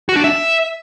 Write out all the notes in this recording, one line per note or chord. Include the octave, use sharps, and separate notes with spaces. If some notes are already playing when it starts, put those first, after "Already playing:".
F#4
D4
E5